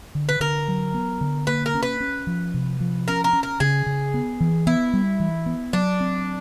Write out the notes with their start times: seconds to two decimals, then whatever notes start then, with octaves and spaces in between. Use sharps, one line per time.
0.15 D3
0.29 B4
0.40 D3 A#4
0.68 F#3
0.94 B3
1.21 D3
1.47 A#3 B4
1.66 A#4
1.74 C#4
1.83 B4
2.00 C#4
2.27 F3
2.54 C3
2.80 F3
3.08 C#4 A#4
3.24 A#4
3.33 C#4
3.43 A#4
3.60 C#3 G#4
3.86 C#3
4.14 B3
4.40 E3
4.67 B3 E4
4.93 G3
5.20 E3
5.46 B3
5.73 F#3 D4
6.00 C4